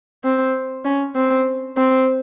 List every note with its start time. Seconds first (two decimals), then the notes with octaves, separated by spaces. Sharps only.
0.24 C4
0.85 C#4
1.15 C4
1.77 C4